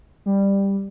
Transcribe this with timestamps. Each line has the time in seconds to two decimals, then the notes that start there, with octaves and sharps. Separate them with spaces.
0.26 G3